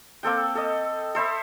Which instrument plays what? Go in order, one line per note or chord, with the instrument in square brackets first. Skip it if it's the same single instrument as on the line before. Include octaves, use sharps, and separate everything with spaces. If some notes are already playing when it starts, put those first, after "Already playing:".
[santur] A#3 C4 A4 G5
A4 D#5
A4 C5 E5 B5